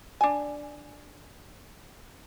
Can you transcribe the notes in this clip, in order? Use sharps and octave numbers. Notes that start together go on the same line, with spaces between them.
D4 G#5